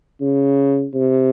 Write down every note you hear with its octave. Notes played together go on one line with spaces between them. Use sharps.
C#3
C3